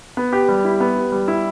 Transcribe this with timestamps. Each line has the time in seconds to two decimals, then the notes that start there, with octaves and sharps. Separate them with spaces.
0.17 B3
0.33 G4
0.49 G3
0.65 E4
0.80 B3
0.97 G4
1.12 G3
1.28 E4